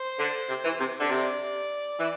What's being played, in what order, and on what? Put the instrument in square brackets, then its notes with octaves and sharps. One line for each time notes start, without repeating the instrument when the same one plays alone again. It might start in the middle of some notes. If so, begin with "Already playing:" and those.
Already playing: [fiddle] C5
[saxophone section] D3
C3
E3
C3
D3
[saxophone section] C3 [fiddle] D5
[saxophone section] E3